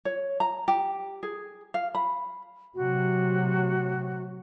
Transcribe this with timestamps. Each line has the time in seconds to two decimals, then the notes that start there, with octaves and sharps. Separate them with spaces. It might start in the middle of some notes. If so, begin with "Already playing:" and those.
0.05 C#5
0.40 A#5
0.68 G4
1.23 G#4
1.74 F5
1.95 B5
2.75 A2 C3 F#3 F#4